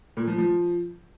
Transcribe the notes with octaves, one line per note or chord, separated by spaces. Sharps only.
A#2
F3
F3